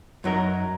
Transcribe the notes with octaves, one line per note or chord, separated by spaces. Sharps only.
F#2 F#3 D#4 A#4